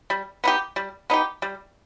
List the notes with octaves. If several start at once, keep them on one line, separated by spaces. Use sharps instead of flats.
G3
B3 D#4 G4
G3
B3 D#4 G4
G3